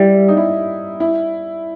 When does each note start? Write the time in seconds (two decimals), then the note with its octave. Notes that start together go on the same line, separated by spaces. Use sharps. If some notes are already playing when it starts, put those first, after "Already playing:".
Already playing: G3 E4
0.28 D#4
0.37 E4
1.00 E4